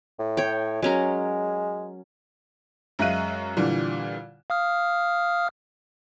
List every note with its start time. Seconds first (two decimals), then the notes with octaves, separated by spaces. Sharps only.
0.19 A2
0.37 C#5 G5
0.82 F#3 G#3 C#4 A#4
2.99 F#2 G#3 E5 F5 F#6 D#7
3.57 A#2 D3 E3 G3
4.50 F5 D#6 F6